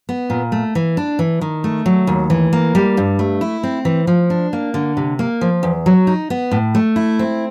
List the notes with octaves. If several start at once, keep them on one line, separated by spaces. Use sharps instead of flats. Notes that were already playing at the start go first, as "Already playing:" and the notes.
B3
A#2
A3
E3
D4
E3
D#3
A3
F#3
D#2
E3
A#3
G3
G2
A3
E4
C4
E3
F3
D4
A#3
D3
C3
A#3
F3
E2
F#3
D#4
B3
A2
A3
E4
C4